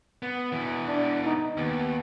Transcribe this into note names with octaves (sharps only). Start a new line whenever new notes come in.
B3
B2 E3
D4
D#4
D#2 B3